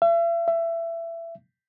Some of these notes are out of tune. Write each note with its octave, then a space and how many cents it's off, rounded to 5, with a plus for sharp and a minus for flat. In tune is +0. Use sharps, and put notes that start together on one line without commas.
E5 +40
E5 +20